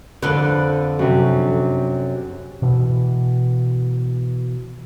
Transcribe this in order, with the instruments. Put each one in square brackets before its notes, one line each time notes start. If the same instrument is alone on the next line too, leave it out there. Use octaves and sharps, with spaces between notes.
[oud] F2 B4 [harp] D3 D5
[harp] F#2 C3
[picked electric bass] B2 E3